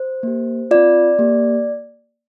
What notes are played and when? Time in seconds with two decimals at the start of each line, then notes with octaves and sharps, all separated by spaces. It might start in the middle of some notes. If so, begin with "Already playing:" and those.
Already playing: C5
0.23 A#3 G4
0.71 C4 F4 D5
1.19 A#3 G4